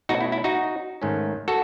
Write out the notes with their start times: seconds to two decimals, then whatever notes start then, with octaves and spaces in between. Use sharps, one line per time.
0.09 B2 A3 C#4 D#4 F#4
0.21 E4
0.32 E4
0.44 D#4 F#4
1.02 G#2 D#3 A3 C#4
1.48 F#4 A4